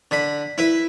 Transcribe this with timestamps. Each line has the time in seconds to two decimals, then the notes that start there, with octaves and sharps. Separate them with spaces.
0.11 D3 B5
0.58 E4 B4